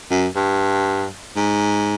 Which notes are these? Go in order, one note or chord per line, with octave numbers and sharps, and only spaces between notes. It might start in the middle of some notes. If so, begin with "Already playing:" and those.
F#2
G2
G#2